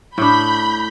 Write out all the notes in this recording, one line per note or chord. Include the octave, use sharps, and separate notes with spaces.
A2 D4 B5 G6